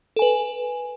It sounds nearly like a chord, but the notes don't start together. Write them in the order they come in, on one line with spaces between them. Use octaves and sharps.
A4 G#5 B4